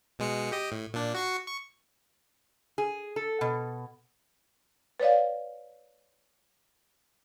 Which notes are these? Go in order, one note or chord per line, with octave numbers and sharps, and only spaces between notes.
B2 G#3 C#7
G4 D#5
A2
A#2 D4
F#4 C#6 C7
C#6
G#4
A4
B2
B4 C#5 D5 F5